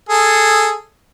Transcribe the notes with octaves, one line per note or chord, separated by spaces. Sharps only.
G#4 A4